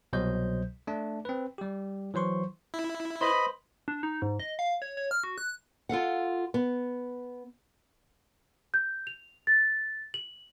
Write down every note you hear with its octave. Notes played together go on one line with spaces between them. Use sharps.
C2 B2 F#3 C5 D#5 G6
A3 D4
C4 B4
G3 G4
E3 F#3 C5 C6 C#6
E4
B4 C5 D#5 B5
D4
D#4
G#2
D#5
F5
C#5
C#5
F6
F#4
F#6
F4 A4 F5 F#5
B3
G6
F7
A6
F#7